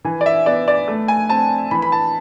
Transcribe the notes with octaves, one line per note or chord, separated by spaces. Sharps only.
E3 G#5
D5
E5
B3 D5
D5
A3
G#5
C4 A5
E3 B5
B5
A5